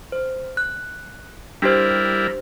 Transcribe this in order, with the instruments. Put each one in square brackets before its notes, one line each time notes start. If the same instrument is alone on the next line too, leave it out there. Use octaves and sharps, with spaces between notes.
[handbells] C5
F#6
[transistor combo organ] G3 E4 A#4 [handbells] D4 G4 C5